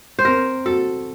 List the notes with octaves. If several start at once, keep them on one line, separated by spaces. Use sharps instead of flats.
C5
C4 A#4
F#4 A4